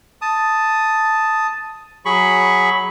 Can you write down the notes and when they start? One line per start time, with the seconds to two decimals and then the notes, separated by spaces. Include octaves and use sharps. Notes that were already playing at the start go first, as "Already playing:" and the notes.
0.22 A5 D#6
2.05 F#3 G#4 B5 C#6